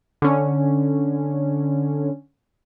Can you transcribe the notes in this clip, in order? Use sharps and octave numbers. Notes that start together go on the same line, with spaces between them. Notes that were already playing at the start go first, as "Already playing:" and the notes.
D3 C#4